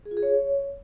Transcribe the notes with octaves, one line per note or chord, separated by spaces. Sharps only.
G#4
F4
G#4
C#5